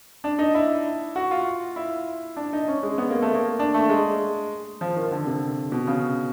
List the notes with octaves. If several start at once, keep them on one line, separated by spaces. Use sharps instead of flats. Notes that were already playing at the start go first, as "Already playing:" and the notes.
D4
D#4
E4
F#4
F4
E4
D4
D#4
C#4
G#3
B3
A#3
A3
A#3
D4
A3
G#3
F3
D#3
D3
C3
B2
C#3